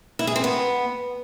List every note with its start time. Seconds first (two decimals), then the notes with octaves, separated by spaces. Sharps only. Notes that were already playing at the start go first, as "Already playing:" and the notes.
0.19 E4
0.27 G#4
0.36 C4
0.44 B3